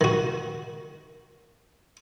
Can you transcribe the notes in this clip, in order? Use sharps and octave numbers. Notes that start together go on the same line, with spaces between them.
D#3 F#4